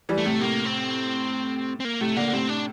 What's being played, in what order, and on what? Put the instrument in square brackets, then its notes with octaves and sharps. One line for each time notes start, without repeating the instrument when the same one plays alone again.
[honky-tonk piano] E3 G3
[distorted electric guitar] A3
[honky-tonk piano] A2 C3
[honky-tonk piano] A2 C3 [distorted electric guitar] A#3
[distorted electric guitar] C4
C4
A#3
[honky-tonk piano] A2 C3 [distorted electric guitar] A3
[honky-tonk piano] A#2 D3 [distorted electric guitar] A#3
[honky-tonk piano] D3
[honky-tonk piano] A2 C3 [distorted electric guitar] C4
[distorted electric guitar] D4